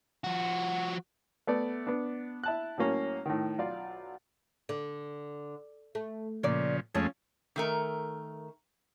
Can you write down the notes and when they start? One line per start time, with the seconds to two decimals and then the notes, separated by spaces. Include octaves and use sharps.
0.24 F3 F#4
1.47 A3 B3 D5
1.87 B3 D4
2.44 E4 A5 F#6
2.78 A2 F#3 A#3 C#4
3.26 A2 D#3
3.58 B1 F4 D5 F5
4.69 D3
5.95 A3
6.43 A#2 C#3 F3 D5
6.95 F2 F3 G#3 A3 C#4
7.56 D#3 A3 A#4